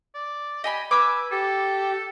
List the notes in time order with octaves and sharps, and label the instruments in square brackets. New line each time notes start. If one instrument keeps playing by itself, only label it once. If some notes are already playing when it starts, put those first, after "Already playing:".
[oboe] D5
[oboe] G4 [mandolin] D#5 G#5 B5
[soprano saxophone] B4 [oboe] G#5 [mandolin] D6 E6
[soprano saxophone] G4 [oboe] A4